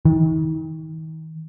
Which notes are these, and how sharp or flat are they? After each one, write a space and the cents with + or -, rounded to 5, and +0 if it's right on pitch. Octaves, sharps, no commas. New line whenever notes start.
D#3 +40